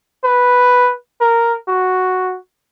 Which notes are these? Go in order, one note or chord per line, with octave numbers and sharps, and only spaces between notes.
B4
A#4
F#4